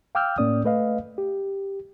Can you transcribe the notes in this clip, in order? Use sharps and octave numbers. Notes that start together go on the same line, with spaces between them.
F5 G5 D6 E6 F6 G6
A2 A#3 C#4 D5 D#6
A3 B4 D#5 F5
G4